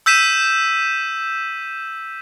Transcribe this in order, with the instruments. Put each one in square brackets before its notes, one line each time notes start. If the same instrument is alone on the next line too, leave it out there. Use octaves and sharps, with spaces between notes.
[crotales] E6 G6 B6 D#7 E7